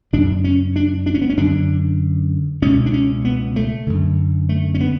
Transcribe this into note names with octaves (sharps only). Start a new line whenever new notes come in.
F#2 C#3 D4
C#4
D4
D4
C#4
B3
C#4
F#2 D3 D4
C#2 B2 C#4
D4
C#4
B3
A3
F#2 D3
A3
C#4
B3